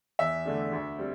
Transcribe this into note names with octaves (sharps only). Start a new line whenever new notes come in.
E2 E5
D3 A3 D4
D2
G3 C4